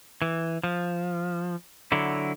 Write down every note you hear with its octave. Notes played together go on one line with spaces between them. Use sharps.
E3
F3
D3 F#3 E4